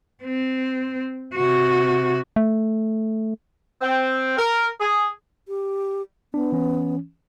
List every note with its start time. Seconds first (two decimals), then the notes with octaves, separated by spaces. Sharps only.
0.23 C4
1.35 C3 F#4
2.36 A3
3.82 C4
4.37 A#4
4.80 G#4
5.48 G4
6.34 B3 D4
6.52 E3 C#4